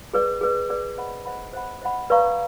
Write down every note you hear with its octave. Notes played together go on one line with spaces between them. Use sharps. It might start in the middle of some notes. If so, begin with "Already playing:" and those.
G#4 B4 D5
G#4 B4 D5
G#4 B4 D5
C5 D#5 F#5 B5
C5 D#5 F#5 B5
C5 D#5 F#5 B5
C5 D#5 F#5 B5
B4 D5 F5 A#5 C#6